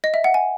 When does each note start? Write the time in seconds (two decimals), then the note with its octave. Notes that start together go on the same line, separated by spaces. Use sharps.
0.04 D#5
0.14 E5
0.24 F#5
0.34 G#5